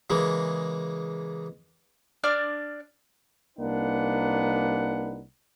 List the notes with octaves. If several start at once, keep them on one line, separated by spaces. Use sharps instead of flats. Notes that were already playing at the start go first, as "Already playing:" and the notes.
C#3 E3 G#3 A#3
D4 D5 F6
C2 A#3 D4 D#4 B4 F#5